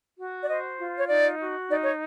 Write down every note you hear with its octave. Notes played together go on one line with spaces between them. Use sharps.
F#4
D5
C5 D#5
F4
C#5
D#4 D5
F#4
D#4 D5
C#5